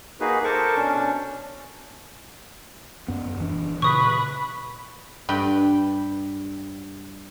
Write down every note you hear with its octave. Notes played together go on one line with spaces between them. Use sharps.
A#3 D#4 F#4 G#4 B4
A4 A#4 C5 C#6 D6
B2 C#4 D4
F#2 B3
D#1 E3 D4
A#2 C#3 B4 C#6 D#6 B6
G2 B4 G5 B5